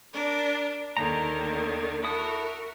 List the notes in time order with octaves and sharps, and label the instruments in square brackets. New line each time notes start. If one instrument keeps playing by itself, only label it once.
[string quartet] D4 A#4 D5
[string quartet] D#2 D3 D#3 [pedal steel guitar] A#3 D#4 A#5
[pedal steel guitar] E4 A4 D#6 [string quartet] F#4 A#4